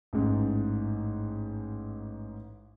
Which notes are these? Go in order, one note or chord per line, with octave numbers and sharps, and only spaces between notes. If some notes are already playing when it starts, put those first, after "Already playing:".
A1 G#2